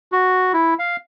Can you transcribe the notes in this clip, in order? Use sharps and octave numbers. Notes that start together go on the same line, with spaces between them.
F#4
E4
F5